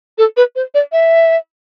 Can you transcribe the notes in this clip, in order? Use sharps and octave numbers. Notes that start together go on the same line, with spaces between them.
A4
B4
C5
D5
E5